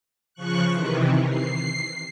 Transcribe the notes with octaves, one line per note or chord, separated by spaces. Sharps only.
C#3 F3 C#6 F#6
C3 D#3 E3
C7